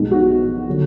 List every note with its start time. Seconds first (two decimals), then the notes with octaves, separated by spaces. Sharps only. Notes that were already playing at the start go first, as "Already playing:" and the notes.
Already playing: B1 B2 G#3
0.11 F#4
0.69 D3 F#3